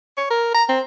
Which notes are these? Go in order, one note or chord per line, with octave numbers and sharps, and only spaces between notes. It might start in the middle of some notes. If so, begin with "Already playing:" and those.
C#5
A#4
A#5
C4